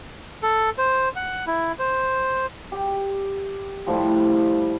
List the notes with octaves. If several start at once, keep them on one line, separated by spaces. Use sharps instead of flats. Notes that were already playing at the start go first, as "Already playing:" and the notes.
A4
C5
F#5
E4
C5
G4
A2 F3 G3